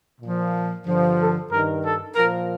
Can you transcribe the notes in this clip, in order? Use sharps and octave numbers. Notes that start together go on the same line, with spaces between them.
A#2 F3
G2 D3 F3
A4
G2 D#3 A#4
A4
A#2 F3 A#4